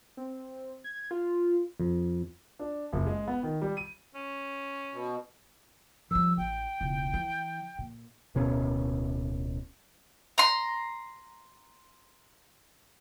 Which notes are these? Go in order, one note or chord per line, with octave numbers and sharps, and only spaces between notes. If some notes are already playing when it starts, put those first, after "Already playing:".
C4
G#6
F4
F2
D4
F#1
G#3
B3
D#3
G3
D#7
C#4
B2
F3 G3 E6
A1 G5
E1 C#2
E3
A#2
D1 B2 C#4
A#5 C6